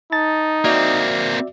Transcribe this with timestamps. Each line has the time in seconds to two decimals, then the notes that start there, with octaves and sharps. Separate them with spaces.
0.12 D#4 A5 A6
0.65 A#3 C4 F#4 D5 E5